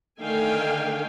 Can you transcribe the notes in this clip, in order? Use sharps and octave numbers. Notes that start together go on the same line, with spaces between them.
D3 D#3 A3 F5 G5 G#5